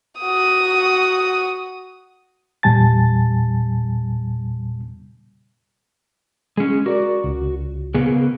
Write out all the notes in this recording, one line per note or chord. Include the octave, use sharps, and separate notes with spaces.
F#4 D#6
E2 A#2 G3 G#5 A5 A6
G#3 C#4 G#4
F#4 A#4 D5
C#2
C#3 A#3 B3 G#4